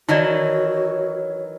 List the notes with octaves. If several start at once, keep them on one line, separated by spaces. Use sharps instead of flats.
D#3 E3 F#3 D#4 F#4 C#5 D5